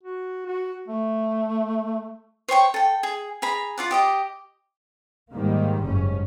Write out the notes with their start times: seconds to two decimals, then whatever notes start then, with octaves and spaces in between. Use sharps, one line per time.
0.03 F#4
0.46 F#4
0.88 A3
2.48 C5 C#5 G5 C#6
2.74 A4 G5
3.03 G#4
3.42 G#4 A#5 B5
3.78 F4 D5 F#5
3.91 G4 D#5 D6
5.32 G#2 D#3 G3 A#3
5.83 F#1 G#2 C#4